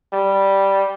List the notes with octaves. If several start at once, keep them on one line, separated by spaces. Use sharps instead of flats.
G3